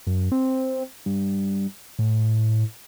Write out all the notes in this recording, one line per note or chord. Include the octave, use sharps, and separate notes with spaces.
F#2
C4
G2
A2